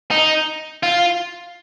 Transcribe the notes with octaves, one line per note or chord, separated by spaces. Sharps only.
D#4
F4